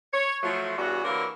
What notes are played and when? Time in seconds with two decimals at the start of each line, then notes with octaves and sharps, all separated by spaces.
0.13 C#5
0.43 F3 F#3 A3
0.77 E2 G2 G3 C#4 F#4
1.04 D3 E3 F#3 A#3 G4 A#4